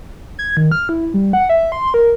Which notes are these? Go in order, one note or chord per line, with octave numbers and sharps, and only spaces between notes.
G#6
D#3
F6
E4
G3
F#5
E5
C6
A#4